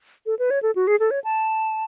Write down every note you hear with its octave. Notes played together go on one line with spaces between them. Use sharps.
A4
B4
C#5
A4
F#4
G#4
A4
C#5
A5